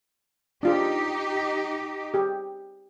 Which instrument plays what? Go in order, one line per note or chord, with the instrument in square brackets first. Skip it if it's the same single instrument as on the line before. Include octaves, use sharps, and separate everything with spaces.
[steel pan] D4 F4 G#4 [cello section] D#4 G4
[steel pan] G4 G#4